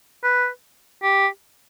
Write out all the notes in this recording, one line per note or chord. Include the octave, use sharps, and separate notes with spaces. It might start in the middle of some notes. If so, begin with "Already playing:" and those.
B4
G4